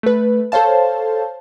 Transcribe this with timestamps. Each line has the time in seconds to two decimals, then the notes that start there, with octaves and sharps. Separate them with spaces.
0.03 A3 B4
0.52 A4 C5 C#5 F5 A5